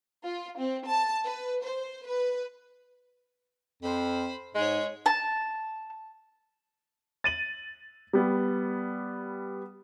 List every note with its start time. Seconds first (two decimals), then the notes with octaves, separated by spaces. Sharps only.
0.24 F4
0.59 C4
0.87 A5
1.24 B4
1.64 C5
2.07 B4
3.82 F2 C5 B5
4.55 G#2 G#3 G#4 C#5
5.06 A5
7.24 A6 D#7 F#7
8.13 G3 B3 G4